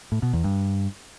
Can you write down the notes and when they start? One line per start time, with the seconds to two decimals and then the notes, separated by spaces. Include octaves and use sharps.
0.12 A2
0.23 B2
0.33 E2
0.44 G2